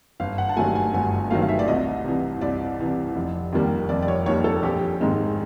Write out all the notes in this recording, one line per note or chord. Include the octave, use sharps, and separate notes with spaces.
G1 F5
F#5
A5
G2 D#3 F#3 A3 G#5
G#5
G1 G#5
G2 D#3 F#3 A3 F5
F5
E5
D5
C2 D#5
C3 E3
C2 D5
C3 E3
F1
D#2 D#3 G3 A#3
F1 D5
D5
C#5
D#2 D#3 G3 A#3 C#5
A4
A#1 G4
G#2 D#3 G#3